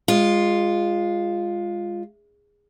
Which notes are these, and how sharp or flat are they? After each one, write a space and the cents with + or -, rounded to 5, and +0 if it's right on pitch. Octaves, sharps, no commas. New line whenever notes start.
G#3 -20 F4 +0